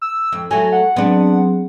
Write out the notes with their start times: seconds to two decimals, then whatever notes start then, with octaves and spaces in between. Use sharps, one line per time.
0.02 E6
0.32 F2
0.51 F#3 A3 G#5
0.72 F#5
0.96 F#3 B3 C4 D4 G#4